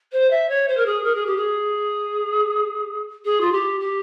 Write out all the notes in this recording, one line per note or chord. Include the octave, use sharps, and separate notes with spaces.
C5
E5
C#5
C5
A#4
G#4
A#4
G#4
G4
G#4
G#4
F4
G4
G4